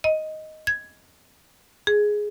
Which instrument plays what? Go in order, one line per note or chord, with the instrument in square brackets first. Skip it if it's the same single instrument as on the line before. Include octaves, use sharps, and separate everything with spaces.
[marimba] D#5
G#6
G#4